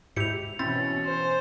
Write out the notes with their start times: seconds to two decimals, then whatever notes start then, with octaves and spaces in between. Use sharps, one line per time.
0.16 G#2 E4 G4 C#7 F7
0.59 B2 E3 C4 C#4 E4 A6
1.05 C5